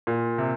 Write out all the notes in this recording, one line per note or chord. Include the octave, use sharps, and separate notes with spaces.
A#2
C3